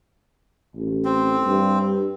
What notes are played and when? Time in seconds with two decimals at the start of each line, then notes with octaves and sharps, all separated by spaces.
0.76 A1
1.05 C4
1.45 G2